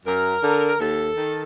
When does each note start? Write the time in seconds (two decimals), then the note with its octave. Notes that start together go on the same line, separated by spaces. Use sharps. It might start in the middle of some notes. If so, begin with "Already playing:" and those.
0.06 F#2 A#4
0.43 D3
0.80 D#2 A4
1.17 D#3